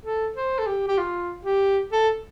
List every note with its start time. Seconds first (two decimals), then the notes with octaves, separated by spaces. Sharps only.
0.05 A4
0.36 C5
0.59 A4
0.67 G4
0.88 G4
0.98 F4
1.45 G4
1.92 A4